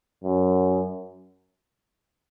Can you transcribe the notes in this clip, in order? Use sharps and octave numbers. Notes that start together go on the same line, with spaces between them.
F#2